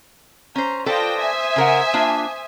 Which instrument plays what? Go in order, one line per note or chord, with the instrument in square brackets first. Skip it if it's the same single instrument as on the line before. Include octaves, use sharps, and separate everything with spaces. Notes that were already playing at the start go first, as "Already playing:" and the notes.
[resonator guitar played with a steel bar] C#4 C5 [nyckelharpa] A#5
[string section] F4 G5 A#6 [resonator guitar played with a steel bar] A4 B4 D5 [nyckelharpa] C5 D#6
[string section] E5 G#5
[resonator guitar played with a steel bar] C#3 A#4 F#5
A#3 D4 F4